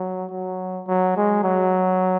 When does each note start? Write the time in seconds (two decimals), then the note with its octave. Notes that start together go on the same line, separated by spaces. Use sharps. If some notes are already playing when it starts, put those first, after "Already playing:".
Already playing: F#3
0.31 F#3
0.87 F#3
1.16 G#3
1.43 F#3